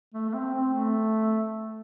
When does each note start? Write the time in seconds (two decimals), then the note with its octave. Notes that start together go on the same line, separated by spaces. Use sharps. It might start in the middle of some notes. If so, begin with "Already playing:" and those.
0.14 A3
0.29 A3
0.34 C4
0.54 C4
0.74 A3